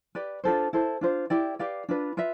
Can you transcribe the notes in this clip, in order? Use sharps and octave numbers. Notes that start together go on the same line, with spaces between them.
G4 B4 D5
D4 F4 A4 C5
E4 A4 C5
D4 F4 C5
E4 G4 D5 G5
G4 B4 D5 F5
D4 F4 B4
F4 B4 E5